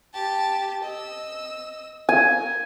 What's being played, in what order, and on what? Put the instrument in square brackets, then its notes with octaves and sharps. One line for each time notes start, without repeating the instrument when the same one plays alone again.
[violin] G4 A5
D#5 E6
[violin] A#4 [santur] G#5